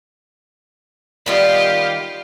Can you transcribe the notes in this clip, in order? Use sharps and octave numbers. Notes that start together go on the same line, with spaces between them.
D#3 G3 B3 F4 G4